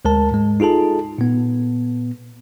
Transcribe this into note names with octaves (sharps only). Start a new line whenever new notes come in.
D2 G#3 A#4 A5
G#2 G#3
D#4 F4 G#4 A4 A5
A#2 B3